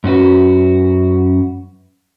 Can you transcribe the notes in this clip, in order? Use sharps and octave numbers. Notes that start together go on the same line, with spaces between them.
F#2 C#4 F#4 B4